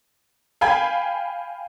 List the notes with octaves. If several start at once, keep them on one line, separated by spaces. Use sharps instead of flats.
F5 G5 G#5 B5 G#6